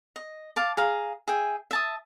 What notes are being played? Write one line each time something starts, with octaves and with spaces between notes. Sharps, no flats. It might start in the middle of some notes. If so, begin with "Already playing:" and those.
D#5
F5 A5 D6
G#4 F5 A#5
G#4 E5 G5 G#5
E5 A5 D#6